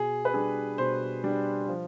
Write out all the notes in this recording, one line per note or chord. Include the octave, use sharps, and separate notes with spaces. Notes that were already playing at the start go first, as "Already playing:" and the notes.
Already playing: B2 G#4
B4
G3 D4 G#4
B2 C5
G3 D4
F3